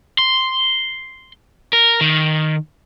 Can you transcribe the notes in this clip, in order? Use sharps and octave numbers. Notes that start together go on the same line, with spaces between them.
C6
A#4
D#3